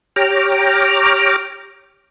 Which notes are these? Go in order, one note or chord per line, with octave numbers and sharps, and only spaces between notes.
G4 C#5 G5 A#5 D6 F6